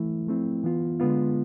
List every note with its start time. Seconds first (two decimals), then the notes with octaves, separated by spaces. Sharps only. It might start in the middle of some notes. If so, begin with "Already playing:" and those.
Already playing: E3 A3 E4
0.27 F3 A3 C4 E4
0.64 E3 B3 F4
1.00 D3 G#3 B3 F4